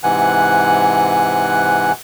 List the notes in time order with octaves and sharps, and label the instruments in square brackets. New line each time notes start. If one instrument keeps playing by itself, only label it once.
[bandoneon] G#2 C3 E3 F#5 G#5 F#6